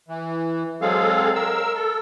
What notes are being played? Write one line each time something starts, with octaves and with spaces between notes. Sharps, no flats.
E3
F#3 G#3 C4 G#4 A4 F5
A#4 E6
A4